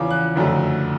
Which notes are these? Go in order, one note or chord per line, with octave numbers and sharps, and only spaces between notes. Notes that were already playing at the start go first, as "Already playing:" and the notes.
Already playing: E2 C#3 F3 D6
F#6
F#1 F2 D3 F#3 A3